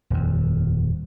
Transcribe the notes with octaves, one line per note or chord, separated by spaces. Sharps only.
D#1 F2